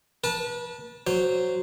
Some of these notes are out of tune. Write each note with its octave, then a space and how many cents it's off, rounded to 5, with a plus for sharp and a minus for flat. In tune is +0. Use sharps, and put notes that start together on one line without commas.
B4 -35 A5 +0
F#3 +0 C5 -10